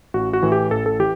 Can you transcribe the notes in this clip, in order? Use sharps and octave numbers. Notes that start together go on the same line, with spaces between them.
A1 F#4
F#4
A2 E3
G4
A1 A4
A4
E3 G4